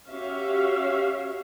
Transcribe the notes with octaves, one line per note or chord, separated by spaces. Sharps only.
C#4 F#4 G4 C#5 E5 F5